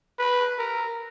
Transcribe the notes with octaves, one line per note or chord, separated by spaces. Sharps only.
B4
A#4